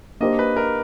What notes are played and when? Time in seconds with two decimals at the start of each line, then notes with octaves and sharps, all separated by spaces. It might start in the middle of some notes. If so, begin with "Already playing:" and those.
0.20 A#3 D4 G4 C5 D#5
0.39 B4
0.56 A#4